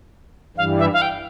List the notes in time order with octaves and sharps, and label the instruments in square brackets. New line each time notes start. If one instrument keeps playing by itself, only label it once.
[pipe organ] G2 E3 G3 [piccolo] F5
[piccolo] E5
F5
G5